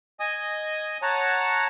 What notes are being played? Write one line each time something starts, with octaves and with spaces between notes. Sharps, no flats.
D#5 G#5 D#6
C#5 F#5 A5 A#5